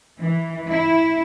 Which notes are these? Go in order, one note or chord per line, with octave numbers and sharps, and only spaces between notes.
E3
E4